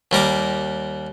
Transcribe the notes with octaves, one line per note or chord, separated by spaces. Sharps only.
D#2 G3 A#4 D6